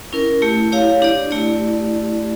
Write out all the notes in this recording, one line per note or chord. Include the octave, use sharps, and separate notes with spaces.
C#4 E4 A#4
A3 E4 G4
E4 G4 C#5 F5
D4 G4 D5
A3 E4 G4 D5